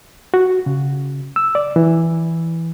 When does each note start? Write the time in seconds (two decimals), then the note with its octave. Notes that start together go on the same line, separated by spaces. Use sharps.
0.34 F#4
0.66 C#3
1.36 E6
1.55 D5
1.76 E3